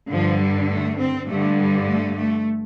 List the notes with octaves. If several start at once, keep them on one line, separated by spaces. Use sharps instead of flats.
G2 D3 F3
G3
A3
C4
G2 D3 A3
G3
A3
A3